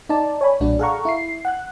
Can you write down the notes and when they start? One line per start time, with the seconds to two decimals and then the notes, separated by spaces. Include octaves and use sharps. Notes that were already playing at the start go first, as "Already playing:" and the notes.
0.09 D#4 D5 A5
0.41 C#5 G#5 B5
0.60 B1 A#2 G3 D4 F#4
0.79 G#4 A4 F5 F#5 A#5 C#6
1.05 E4 C7
1.45 F#5 F#6